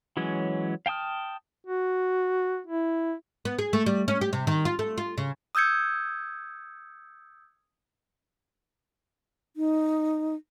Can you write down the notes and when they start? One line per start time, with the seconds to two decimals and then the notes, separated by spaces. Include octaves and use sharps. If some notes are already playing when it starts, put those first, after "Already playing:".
0.17 E3 F#3 G#3 C#4
0.86 F5 G5 A5 D#6 F6
1.67 F#4
2.67 E4
3.45 B3
3.59 G#4
3.73 A3
3.86 G3
4.08 C#4
4.21 G4
4.33 C3
4.47 D#3
4.65 F4
4.79 A3
4.98 F4
5.18 C#3
5.55 D#6 E6 G6 G#6 C#7
9.57 D#4